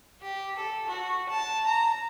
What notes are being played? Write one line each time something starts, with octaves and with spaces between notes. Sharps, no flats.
G4
A4
F#4
A5
A#5